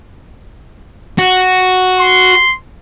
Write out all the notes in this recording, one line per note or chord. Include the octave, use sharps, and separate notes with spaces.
F#4
C6